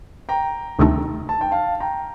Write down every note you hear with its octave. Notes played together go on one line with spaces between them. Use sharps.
G5 A#5
D2 C3 D#3 A3 D#4
A5
G5
F5 A5
G5 A#5